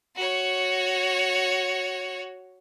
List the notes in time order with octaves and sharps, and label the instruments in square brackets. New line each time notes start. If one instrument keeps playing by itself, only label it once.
[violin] F#4 C#5